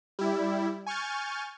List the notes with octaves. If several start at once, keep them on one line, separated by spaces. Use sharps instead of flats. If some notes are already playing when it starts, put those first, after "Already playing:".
G3 E4
G#5 C#6 F6 G6 A6